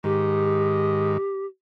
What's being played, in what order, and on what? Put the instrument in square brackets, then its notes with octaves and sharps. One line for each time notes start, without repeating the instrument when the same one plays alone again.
[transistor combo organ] G#2 D#3 [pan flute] G4